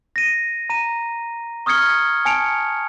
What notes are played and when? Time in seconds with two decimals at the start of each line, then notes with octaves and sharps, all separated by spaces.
0.16 A#6 D#7
0.70 A#5 D#7
1.66 C#6 D#6 F6 G#6 C#7 G7
2.25 G#5 A5 C#7 D7 F7